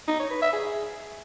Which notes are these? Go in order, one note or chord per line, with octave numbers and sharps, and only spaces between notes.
D#4
C#5
B4
E5
G#4